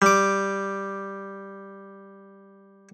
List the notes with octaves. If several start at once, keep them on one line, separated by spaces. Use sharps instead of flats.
G3 D6